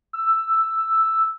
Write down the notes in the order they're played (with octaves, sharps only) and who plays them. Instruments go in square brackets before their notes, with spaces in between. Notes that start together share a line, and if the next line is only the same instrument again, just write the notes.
[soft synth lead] E6